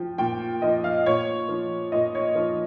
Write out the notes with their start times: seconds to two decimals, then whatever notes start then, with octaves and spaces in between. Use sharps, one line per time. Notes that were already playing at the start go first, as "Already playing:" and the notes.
Already playing: F3 G5
0.18 A#2 G5
0.62 F3 D#5
0.84 F5
1.06 A#2 C#5
1.48 F3
1.92 A#2 D#5
2.15 C#5
2.35 F3